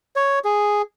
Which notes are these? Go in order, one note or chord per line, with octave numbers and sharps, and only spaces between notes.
C#5
G#4